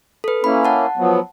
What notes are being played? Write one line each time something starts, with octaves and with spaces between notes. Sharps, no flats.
A4 B4
A#3 C#4 E4 B5
F#5 A5
F3 F#3 B3